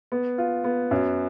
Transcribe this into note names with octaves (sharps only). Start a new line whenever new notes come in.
B3
F4
B3
F#2